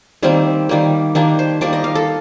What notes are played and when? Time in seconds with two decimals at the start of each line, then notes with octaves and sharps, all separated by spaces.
0.23 D#3 G3 A#3 C4
0.69 D#3 G3 A#3
1.15 D#3 G3 A#3 D4
1.39 C5
1.61 D#3 G3 A#3 D5
1.73 D#5
1.84 F5
1.95 A4